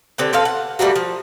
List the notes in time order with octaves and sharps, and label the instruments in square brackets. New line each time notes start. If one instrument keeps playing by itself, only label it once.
[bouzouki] D3 C4 G4 B4
C4 A4 B4 F5
F#5
G3 A3 A#3 F#4
F3